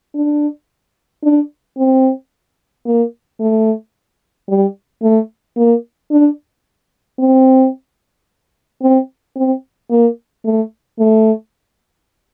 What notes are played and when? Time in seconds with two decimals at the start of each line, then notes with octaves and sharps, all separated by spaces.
0.15 D4
1.23 D4
1.78 C4
2.86 A#3
3.40 A3
4.48 G3
5.03 A3
5.57 A#3
6.11 D4
7.19 C4
8.82 C4
9.36 C4
9.90 A#3
10.45 A3
10.99 A3